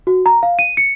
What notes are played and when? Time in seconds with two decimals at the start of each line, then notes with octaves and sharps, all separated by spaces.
0.07 F#4
0.26 A#5
0.43 F5
0.59 D#7
0.77 C#7